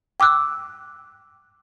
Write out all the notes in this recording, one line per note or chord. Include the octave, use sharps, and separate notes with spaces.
G5 D6 E6 F#6